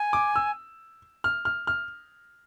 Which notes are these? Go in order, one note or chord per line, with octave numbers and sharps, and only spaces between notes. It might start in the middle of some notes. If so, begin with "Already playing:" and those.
Already playing: G#5
D6
E6
F6
F6
F6